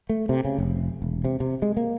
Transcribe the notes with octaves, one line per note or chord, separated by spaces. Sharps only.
A3
C3
C#3
F1
E1
C3
C3
G#3
A#3